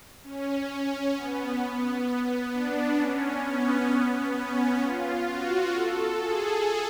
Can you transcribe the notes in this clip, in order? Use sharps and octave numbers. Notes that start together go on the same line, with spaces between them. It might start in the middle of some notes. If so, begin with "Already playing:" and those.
C#4
B3
B3
D4
C#4
B3
C#4
F4
F#4
A4
G#4